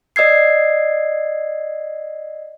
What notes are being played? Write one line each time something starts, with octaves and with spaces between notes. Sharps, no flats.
D5 D#5 E6 G#6 C7